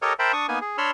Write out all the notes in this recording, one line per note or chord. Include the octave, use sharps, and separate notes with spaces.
G4 A4 A#4 C#5 D#5
A#4 C5 E5 G5 A5 B5
D4 C#6 D#6
A#3 B3 D#4 G#5
G#4
D4 C#5 B5 C6 E6 F6